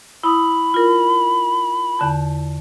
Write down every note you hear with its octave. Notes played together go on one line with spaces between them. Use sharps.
E4 B5 D#6
F4 A#4
E2 D3 A5